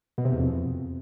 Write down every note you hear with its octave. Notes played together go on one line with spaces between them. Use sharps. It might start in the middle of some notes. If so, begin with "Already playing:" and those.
B2
C3
E2
F2